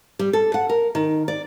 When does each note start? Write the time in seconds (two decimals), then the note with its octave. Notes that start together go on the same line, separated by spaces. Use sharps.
0.19 G3
0.33 A4
0.54 F#5
0.69 A#4
0.95 D#3
1.28 D5